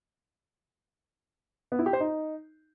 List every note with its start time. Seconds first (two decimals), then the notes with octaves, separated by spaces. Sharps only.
1.72 B3
1.79 E4
1.86 G4
1.93 C5
2.00 D#4